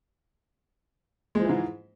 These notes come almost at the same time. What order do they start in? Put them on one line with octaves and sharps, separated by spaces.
G#3 F3 E3 G#2